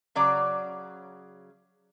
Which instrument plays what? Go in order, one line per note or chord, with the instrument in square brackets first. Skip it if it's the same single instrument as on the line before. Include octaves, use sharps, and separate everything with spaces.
[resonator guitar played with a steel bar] C#3 F#3 D5